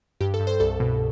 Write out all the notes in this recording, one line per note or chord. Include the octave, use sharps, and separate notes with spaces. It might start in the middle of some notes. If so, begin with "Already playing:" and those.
G2 G4
A4
G2
C5
C2 A4
B2